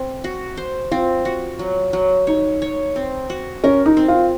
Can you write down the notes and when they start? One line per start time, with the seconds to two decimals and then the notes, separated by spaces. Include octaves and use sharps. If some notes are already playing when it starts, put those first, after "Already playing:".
Already playing: C4
0.24 F#4
0.57 C5
0.91 C4 F4
1.25 F#4
1.59 F#3
1.93 F#3
2.27 D#4 C#5
2.62 C#5
2.96 C4
3.30 F#4
3.64 C#4 A#4
3.86 D#4
3.97 C4
4.08 F4